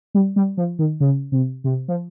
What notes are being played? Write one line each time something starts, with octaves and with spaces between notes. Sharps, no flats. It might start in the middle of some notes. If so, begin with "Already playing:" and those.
G3
G3
F3
D#3
C#3
C3
C3
F3